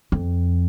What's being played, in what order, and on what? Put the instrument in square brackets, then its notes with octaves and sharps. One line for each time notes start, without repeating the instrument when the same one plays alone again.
[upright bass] F2